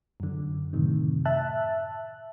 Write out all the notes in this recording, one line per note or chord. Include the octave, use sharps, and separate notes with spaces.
F#2 D3
F#2 A2 C3 D#3
E5 A5 F#6